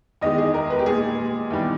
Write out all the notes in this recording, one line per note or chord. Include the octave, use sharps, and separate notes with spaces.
E2 D#3 G#3 D#5
G#4
A#4
B4
G4
A#2 G#3 G#4
E2 D#3 G3